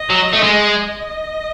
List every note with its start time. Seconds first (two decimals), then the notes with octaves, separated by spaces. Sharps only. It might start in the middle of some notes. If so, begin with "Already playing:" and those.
Already playing: D#5
0.10 F#3
0.33 A3
0.44 G#3
0.78 D#5